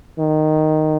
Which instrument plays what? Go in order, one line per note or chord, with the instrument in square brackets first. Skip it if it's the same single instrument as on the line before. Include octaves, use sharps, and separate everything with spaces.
[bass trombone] D#3